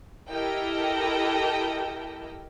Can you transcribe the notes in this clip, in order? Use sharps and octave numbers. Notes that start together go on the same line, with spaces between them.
E4 G4 A4 A#4 D#5 G5